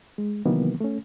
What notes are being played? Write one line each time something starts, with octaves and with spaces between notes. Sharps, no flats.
G#3
C3 D#3 E3 F#3 A#3 B3
A3 C#4